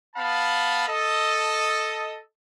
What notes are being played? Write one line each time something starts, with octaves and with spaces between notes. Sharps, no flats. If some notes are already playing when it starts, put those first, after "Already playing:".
B3 F5 A5 B5
A4 D#5